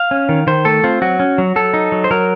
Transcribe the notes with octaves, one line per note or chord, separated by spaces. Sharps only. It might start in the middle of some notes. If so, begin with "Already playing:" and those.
Already playing: F5
C#4
D#3
D#3 C5
A3 A4
C4 F4
F#3 F#4
C#4
F#3
F#3 A4
D#4
F#3
C5
F#3 A#4